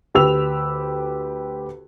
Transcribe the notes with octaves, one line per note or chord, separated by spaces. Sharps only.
D2 G4 B4 E6 F7